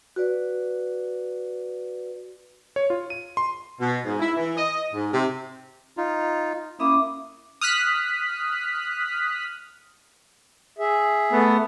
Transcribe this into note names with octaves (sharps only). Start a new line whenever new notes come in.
F#4 B4 D5
C#5
F4
D#7
C6
B2
G#2
E4
E3
D#5
G#2
C3
D#4 F4
A#3 C#4 E4 E5 D6 D#6
D#6 F6 F#6 B6
G#4 E5
A3 B3